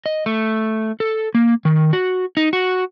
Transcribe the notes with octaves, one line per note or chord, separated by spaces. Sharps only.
D#5
A3
A4
A#3
D#3
F#4
D#4
F#4